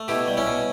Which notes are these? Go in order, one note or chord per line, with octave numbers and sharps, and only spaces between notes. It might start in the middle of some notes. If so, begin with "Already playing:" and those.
Already playing: A3
B2 E4 G4
G3
C#4 E4
B2